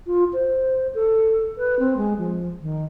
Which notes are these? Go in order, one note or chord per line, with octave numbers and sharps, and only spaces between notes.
F4
C5
A4
B4
C4
G#3
F3
D#3